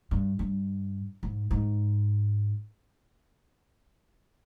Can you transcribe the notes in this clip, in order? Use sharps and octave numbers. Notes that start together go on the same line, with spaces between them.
G2
G2
G#2
G#2